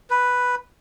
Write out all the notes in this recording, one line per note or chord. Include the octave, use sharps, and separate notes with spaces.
B4